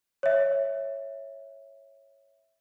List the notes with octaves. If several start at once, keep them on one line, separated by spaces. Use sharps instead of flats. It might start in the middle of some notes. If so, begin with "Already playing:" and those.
C#5 E5